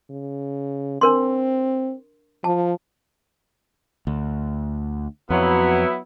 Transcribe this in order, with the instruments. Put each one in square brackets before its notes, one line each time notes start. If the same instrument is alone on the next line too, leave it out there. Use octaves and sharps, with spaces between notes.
[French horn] C#3
[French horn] C4 [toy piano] D4 A#4 C6
[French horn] F3 [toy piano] A5
[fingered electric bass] D2
[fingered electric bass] F2 [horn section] F#3 B3 E4